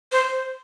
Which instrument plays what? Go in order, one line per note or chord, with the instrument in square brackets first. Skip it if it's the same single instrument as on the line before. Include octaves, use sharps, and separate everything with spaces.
[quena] C5